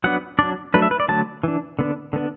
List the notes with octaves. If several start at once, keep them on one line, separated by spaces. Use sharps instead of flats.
F#3 B3 D4 F#5
F#3 D4 D5
F#3 A3 D4 B4
E5
B4
D5
D3 F#3 A3 A5
E3 D4
D3 B3 D4
D3 B3 D4